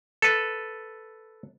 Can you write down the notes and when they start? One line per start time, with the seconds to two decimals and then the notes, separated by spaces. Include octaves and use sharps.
0.22 A4 B4